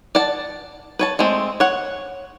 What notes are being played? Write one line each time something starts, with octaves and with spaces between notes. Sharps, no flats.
D5 F#5 A5
B4 C#5 A5
G#3 A3 C4
C#5 F#5